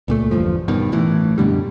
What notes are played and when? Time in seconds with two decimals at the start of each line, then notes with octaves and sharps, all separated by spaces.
0.08 C#2 A#2 A3
0.31 G1 E2 G2 F3
0.68 G2 B2 D#3
0.92 A1 A2 E3
1.38 F#2 B2 D3 G3